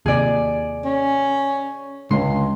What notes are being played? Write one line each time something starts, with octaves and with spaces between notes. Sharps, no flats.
D#2 C3 G#4 D5
C#4
C#2 D3 G#3 C6